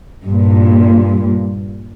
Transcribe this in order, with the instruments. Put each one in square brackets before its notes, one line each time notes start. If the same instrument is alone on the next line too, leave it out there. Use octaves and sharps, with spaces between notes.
[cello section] G2 A#2